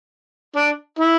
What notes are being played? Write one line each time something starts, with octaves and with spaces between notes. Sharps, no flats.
D4
E4